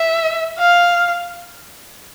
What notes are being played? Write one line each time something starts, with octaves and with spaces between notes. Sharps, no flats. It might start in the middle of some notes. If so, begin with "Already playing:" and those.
Already playing: E5
F5